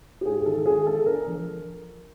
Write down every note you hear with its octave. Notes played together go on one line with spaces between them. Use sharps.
G4
G#2 G#4
G#4
D#3 A4
D#3 G#4
G#3 A4
D4 A#4
F3